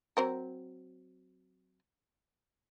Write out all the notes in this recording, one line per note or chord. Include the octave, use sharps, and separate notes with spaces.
F#3 C4 A#4